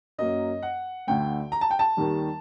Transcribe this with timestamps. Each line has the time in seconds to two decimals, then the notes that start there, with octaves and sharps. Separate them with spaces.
0.18 F#2 F#3 A#3 D#5
0.62 F#5
1.07 D2 D3 A3 G5
1.52 A#5
1.61 A5
1.71 G5
1.79 A5
1.97 D#2 D#3 G3